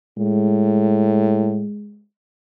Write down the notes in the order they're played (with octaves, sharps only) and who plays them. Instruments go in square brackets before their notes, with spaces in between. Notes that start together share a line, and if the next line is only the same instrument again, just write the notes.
[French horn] A2 [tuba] G#3